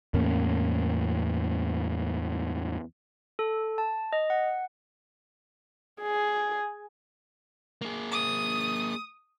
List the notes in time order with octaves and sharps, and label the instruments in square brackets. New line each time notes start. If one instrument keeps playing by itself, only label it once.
[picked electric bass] E2 A2 A#3 C#4
[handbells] A4
A5
D#5
F#5
[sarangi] G#4
[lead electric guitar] A#3 G#4
[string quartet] D#6